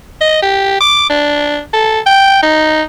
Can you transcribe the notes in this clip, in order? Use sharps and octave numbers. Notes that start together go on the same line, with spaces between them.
D#5
G4
D6
D4
A4
G5
D#4